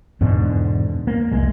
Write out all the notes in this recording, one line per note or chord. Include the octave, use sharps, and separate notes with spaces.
E2 G#2 B2 D3
A#3
F1 C2 G#3